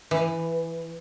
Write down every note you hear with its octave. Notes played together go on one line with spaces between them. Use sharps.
E3